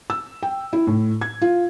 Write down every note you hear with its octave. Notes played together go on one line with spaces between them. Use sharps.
E6
G5
E4
A2
G#6
F4